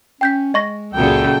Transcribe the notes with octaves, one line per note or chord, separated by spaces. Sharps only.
C#4 G5 G6 B6
G#3 D#5 C#6 A#6
C#2 F#2 A#2 C#3 A4 G5